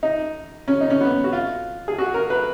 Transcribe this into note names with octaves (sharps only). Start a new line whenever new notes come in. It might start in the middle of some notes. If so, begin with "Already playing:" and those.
D#4
C#4
D#4
C#4
B3
F#4
F4
G#4
F#4
A#4
B4